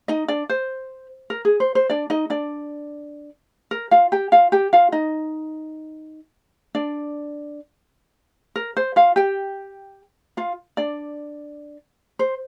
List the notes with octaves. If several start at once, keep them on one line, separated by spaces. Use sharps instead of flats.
D#4 D#5
D4 D5
C5
A#4
G#4
C5
C5
D4 D5
D#4 D#5
D4 D5
A#4
F4 F5
G4 G5
F4 F5
G4 G5
F4 F5
D#4 D#5
D4 D5
A#4
C5
F4 F5
G4 G5
F4 F5
D4 D5
C5